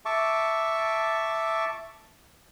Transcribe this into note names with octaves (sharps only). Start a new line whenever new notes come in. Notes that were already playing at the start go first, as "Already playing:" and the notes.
E5 A5 C#6 D6